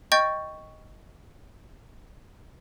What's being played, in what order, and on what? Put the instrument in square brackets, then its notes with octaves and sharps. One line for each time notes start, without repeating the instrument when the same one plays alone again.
[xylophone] D#5 G5 C#6 G6 A6